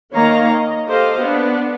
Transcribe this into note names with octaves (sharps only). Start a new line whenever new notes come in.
D#3 A#3 C#5 D#5 F5 A#5
D#5
G4 A4 C5 D#5 F5
B3 D4